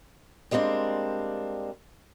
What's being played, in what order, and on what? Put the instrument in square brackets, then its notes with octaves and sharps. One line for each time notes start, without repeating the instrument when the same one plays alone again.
[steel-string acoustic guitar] G3 G#3 A#3 C4 D4